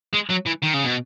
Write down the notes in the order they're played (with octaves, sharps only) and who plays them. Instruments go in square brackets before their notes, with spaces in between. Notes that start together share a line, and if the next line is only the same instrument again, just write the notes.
[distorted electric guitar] G#3
F#3
E3
D#3
C#3
B2